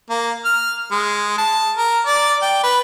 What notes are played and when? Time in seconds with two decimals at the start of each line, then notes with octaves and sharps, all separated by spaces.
0.10 A#3
0.45 F6
0.92 G#3
1.38 A5
1.77 A#4
2.07 D5
2.42 G5
2.64 B4